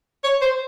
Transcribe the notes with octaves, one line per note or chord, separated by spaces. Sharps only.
C#5
C5